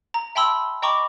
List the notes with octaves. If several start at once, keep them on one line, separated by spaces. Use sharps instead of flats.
A#5
E5 G5 A5 B5 C6 E6
D#5 G5 A#5 B5 C#6 D6